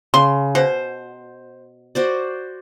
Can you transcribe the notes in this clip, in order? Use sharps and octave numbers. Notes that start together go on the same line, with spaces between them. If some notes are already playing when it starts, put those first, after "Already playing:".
C#3 C6
B2 C5
F#4 C5 D5